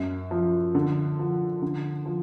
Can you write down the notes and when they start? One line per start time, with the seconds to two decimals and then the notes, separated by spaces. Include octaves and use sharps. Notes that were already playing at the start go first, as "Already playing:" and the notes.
Already playing: F#2
0.31 F3
0.75 D3
1.19 F3
1.62 D3
2.06 F3